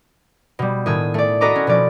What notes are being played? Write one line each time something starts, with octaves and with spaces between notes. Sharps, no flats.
B2 G3
A2 D#3 G#4 E6
A3 D5
F#4 A4 B4 D#5 A#5 D6
C#4
B2 F3 D5